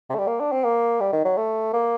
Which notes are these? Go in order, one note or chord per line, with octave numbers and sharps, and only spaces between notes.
C3
A3
G3
A#3
D4
C4
A#3
G3
D#3
F#3
A3
A#3